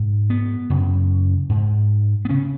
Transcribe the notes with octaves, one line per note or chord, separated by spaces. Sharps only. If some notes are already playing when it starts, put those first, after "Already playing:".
Already playing: G#2
B3
F#2 C#3
G#2
B3
C#3 C#4